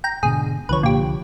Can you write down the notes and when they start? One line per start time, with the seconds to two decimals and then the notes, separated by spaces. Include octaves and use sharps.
0.04 G5 A#5
0.23 G#2 B2 D3 G#4
0.69 C2 D3 F3 B4 C#5
0.83 A#2 G4